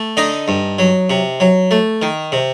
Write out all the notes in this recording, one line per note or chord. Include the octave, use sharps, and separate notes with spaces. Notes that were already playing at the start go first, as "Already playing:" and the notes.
Already playing: A3
D3 D#4 D#5
G2
F#3
C3
F#3
A3
D#3
C3